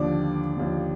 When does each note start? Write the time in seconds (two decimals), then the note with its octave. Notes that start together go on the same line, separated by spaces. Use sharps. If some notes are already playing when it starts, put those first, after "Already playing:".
Already playing: D#2 D3 F3 D5 D6
0.56 D#2 D3 F3